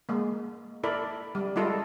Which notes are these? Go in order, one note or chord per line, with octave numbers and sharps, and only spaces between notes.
G#3 A#3
E4 A4 A#4 D5 B5
G3
G3 G#3 E4 F4 A4 D#5